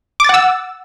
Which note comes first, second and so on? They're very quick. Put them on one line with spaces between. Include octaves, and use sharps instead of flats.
D6 A6 F#5 E6